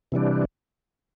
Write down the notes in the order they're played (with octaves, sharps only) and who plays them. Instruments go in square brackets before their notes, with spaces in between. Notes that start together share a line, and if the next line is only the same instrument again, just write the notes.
[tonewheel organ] C3 E3 G3 D4